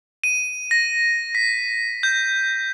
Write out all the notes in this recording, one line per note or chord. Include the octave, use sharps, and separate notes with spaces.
D#7
A#6
B6
G6